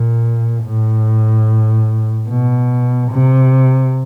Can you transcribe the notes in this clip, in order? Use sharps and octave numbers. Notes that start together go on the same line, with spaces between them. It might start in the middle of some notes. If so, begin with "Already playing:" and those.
Already playing: A#2
A2
B2
C3